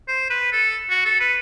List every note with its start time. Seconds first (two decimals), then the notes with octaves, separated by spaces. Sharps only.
0.08 C5
0.30 B4
0.52 A4
0.90 F#4
1.05 A4
1.20 B4